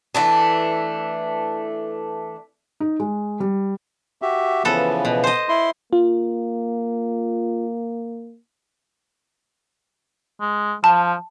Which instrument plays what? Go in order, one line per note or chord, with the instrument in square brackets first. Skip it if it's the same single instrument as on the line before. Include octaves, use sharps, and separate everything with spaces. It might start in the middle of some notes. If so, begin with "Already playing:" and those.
[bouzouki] E3 A3 D4
[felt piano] D#4
G#3
G3
[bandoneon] F#4 G4 E5
[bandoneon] C#3 E3 F3 [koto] B3 A4
[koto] B2
C5 D#5
[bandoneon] E4 C6
[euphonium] A#3 [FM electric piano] F4
[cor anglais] G#3
[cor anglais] F3 [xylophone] A5